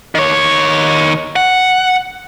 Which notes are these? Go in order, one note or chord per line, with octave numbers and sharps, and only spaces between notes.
D#3 C#5
F#5